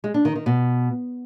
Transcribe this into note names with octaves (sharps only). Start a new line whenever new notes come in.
G#3
D4
D#3
D#3
B2